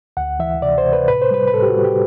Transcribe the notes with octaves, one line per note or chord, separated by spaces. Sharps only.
D2 F#5
E3 E5
C3 D5
C5
C3
B4
A2 B4
C5
G3 B4
B4
A2 A4
G4
F#4
G3
G4